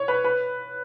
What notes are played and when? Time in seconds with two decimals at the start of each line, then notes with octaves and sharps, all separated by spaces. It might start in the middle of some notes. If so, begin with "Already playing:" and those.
Already playing: C#5
0.08 B4
0.24 B4